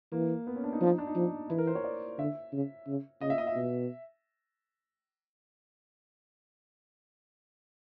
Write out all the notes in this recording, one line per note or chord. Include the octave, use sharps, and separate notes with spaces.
E3 A#3
B3
C#4
D4
D#4
F3 D4
D#4
D4
D#4
F3
E3 E4
A#4
C5
C#5
D5
D3 E5
C#3
C#3
C#3 D#5
E5
D#5
E5
B2